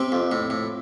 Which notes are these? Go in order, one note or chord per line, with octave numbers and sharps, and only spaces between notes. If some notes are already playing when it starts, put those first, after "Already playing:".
Already playing: C3 C4
F2
A2
A2